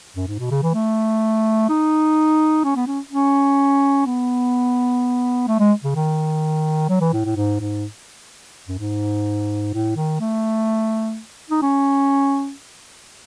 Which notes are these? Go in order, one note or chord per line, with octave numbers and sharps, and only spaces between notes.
F#2
G#2
B2
C#3
E3
A3
D#4
C#4
B3
C#4
C#4
B3
A3
G#3
C#3
D#3
F#3
E3
A2
A2
G#2
G#2
F#2
G#2
A2
D#3
A3
D#4
C#4